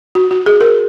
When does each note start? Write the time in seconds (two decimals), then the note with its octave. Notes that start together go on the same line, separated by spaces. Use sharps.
0.15 F#4
0.31 F#4
0.46 G#4
0.61 A#4